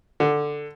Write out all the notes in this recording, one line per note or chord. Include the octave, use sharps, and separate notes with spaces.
D3